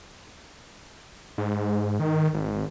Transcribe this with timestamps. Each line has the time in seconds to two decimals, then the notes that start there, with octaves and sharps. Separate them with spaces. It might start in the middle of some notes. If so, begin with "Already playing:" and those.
1.38 G#2
2.00 D#3
2.33 G#1